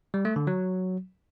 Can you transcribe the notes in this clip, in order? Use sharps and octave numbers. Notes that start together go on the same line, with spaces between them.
G3
A3
D3
F#3